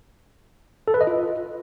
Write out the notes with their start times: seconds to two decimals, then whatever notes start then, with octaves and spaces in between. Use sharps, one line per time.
0.88 A4
0.94 B4
1.01 D#5
1.07 F4